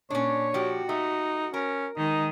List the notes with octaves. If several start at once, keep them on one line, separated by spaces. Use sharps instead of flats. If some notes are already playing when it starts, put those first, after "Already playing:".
A#2 C#4 D4 C#5
F3 F#4 G4
A3 D#4
C#4 A#4
D#3 G#3 D#4